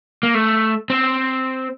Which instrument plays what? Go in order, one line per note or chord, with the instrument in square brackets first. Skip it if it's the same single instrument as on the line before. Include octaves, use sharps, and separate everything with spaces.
[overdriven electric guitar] A#3
A3
C4